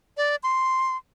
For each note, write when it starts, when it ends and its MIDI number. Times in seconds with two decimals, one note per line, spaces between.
0.17 0.36 74
0.43 0.96 84